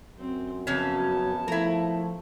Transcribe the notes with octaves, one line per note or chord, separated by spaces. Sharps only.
F#2 C4
F2 C#3 F#3 B3 C#4 A5
F3 A3 E4 A#4